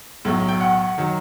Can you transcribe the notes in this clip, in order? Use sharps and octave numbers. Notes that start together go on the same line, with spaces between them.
B1 A2 F#3
G5
F#5
D#3 F#3